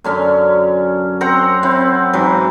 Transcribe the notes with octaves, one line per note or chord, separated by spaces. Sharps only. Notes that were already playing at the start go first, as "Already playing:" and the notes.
F#2 D3 C#4
C4 C5 F#5 A#5
C4 E4 F#5
G#2 E3 F#3